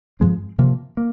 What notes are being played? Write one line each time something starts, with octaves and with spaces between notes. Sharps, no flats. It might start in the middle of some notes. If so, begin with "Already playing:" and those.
G2 F3 G#3 C4
C3 F3 A#3
A#3